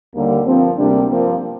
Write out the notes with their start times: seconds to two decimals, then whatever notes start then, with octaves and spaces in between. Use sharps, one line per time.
0.14 D#2 D3 G3 A#3
0.46 G2 F3 A#3 C4
0.78 D2 C3 G3 A#3 D4
1.10 G2 F3 A#3 C4